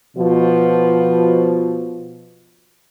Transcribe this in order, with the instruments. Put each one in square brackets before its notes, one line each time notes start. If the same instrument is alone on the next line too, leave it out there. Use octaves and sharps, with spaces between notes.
[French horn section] B2 F3